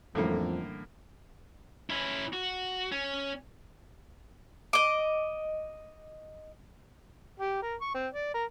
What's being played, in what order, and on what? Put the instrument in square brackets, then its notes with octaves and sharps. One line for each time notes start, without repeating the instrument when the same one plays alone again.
[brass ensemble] F2 [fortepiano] A2 D3 A#3 [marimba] E3 G3 C#4
[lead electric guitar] C#4 E4
F#4
C#4
[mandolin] D#5 D6
[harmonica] G4
A#4
C#6
C4
D5
A#4